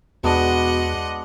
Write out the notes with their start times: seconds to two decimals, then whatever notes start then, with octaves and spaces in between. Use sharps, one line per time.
0.24 E2 B2 G#3 B3 D4 D#5 F#5